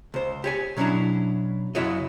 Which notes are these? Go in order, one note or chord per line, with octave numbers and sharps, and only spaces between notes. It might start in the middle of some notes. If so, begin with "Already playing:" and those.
C#2 C5
G4 C#5 G#5
B2 F#3 C#4 D4 E4 A#5
F#2 C#3 E4 F#4 C#5 D#5